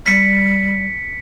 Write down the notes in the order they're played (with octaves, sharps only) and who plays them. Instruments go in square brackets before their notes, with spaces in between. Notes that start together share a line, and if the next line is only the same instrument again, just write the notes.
[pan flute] G3 [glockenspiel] B6 C#7